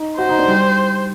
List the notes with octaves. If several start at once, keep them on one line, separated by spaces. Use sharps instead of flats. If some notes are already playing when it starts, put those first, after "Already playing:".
Already playing: D#4
F#4 C5
D#4
D4
G3